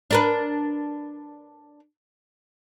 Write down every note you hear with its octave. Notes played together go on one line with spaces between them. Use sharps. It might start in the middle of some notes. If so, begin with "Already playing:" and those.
D4 A#4 B4